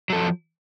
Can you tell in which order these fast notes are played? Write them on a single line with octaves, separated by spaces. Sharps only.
F#3 A4 F3